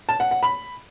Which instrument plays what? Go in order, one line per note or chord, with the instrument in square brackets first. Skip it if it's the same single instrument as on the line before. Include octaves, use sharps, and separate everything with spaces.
[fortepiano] A5
F#5
F#5
B5